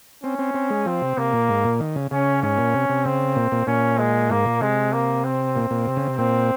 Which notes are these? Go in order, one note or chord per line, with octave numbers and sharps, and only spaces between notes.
C4 C#4
C4
C4
G#3
F3 C4
C3
C3 A#3
A#2
G#2
A#2
D#3
C#3
C#3 C#4
G#2 C#4
A#2
C3
C3
C#3 C4
A#2
A#2
A#2 C#4
G#3
G#2 A#3
A#2
C3 G#3
A#3
C4
A#2
A#2
C3
C#3
C3
A#2 C4